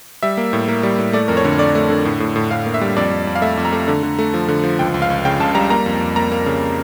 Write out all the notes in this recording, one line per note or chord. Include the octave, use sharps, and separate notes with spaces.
G3 E5
A#3
A2
A#3
G3
A2
A3 D5
F2 A#4
C#5
D3
A3 D5
A3
D3
A2
A2
A2
A2 F5
A#3
E5
G3
F2 D5
F2
F2
F5
A3 E5
F2
A#5
A3
D3
D3
A3
F3
D3
F3
C#2 G5
C#2
F5
C#2
C#3 G5
C#2 A5
G3 A#5
A#3 A#5
F2
F2
A#3 A#5
A#3
C#3